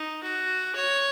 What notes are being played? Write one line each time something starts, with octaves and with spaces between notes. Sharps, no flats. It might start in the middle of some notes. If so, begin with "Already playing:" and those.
Already playing: D#4
F#4
C#5